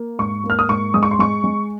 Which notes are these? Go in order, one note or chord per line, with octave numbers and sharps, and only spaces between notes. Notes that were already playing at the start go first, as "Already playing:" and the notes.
Already playing: A#3
G#2 C#6
A#3
F6
D#6
G#2 C#6
G#3 D#6
C#6
C6
G#3 C#6
G#3